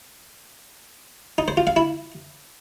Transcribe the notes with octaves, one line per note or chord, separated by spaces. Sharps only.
D#4
C5
F4
F5
E4